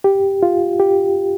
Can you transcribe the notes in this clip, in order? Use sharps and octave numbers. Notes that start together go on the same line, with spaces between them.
G4
F4
G4